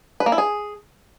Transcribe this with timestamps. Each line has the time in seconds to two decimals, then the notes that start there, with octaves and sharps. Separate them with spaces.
0.20 B4
0.26 A#3
0.32 E4
0.38 G#4